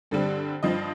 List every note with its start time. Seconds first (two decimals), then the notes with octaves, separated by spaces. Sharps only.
0.11 G2 D3 G3 C4 A4
0.63 G2 F3 C4 D#5